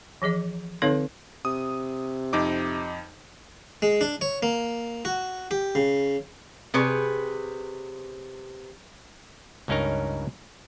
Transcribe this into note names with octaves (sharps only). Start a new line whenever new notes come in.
E3 F3 G#4 D#5
D3 C4 D#4 A4 C#5 F5
C3 D#6
F2 D#4 D6
G#3
D4
C#5
A#3
F#4
G4
C#3
C3 G#4 B4 C#5
C#2 G2 C#4 D#4 A#4 A#5